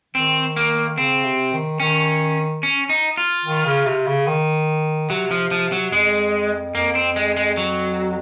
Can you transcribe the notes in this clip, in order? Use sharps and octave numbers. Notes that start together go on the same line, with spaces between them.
D#3 C4
A#3
C#3 C4
C3
D#3
D#3 C#4
C#4
D#4
F4
D#3
C#3
C3
C#3
D#3
C3 F#3
F3
F3
F#3
F2 G#3
F2 A#3
C4
G#3
G#3
F#3